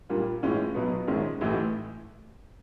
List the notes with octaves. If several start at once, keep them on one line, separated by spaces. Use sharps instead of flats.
A#2 G3 A#3 D4 F4
A2 E3 G#3 C#4 F4
B1 B2 F#3 B3
A#1 G#2 D#3 G#3 C#4
A1 A2 E3 A3